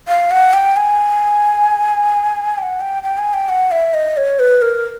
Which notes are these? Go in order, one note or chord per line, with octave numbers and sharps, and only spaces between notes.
F5
F#5
G5
G#5
G5
F#5
G5
G5
G#5
G5
F#5
E5
D#5
C#5
B4
A#4